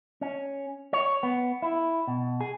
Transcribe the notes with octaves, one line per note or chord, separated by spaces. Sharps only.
C#4
C#5
B3
E4
B2
G#4